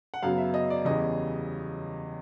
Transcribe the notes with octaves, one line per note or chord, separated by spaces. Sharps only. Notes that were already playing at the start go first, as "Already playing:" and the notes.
F#5
F#2 C#3 F#3 B3 F5
E5
D#5
D5
E2 C#3 E3 G3 D#5